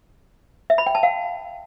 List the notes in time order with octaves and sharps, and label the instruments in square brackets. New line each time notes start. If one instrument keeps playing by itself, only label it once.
[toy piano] E5
B5
G5
A5
F5